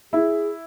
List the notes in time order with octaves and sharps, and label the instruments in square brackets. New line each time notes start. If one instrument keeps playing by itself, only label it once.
[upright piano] E4 [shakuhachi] G#4